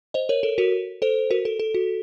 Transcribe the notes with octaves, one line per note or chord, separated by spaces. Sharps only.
C5 D#5
A#4 C#5
A4
F#4 A#4
A4 C5
F#4 A#4
A4
A4
F#4